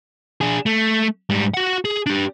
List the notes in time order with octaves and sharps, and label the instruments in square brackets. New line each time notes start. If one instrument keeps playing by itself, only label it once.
[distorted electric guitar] D4 G#4
A3
G#2 G3
F#4 F#5
G#4
D4 G4